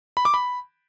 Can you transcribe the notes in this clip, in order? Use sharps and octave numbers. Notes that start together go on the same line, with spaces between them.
B5
D6
B5